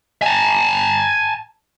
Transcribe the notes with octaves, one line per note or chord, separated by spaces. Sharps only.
G#5 A5